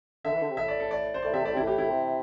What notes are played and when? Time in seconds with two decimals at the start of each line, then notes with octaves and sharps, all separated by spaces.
0.25 D3 E5
0.33 E3
0.41 D3
0.49 C3
0.57 A2 E5
0.68 D5
0.80 A4
0.91 D5
1.14 C5
1.23 A2 D5
1.33 C3 E5
1.43 A2 D5
1.53 C3 E4
1.62 A2 G4
1.78 E4
1.89 C3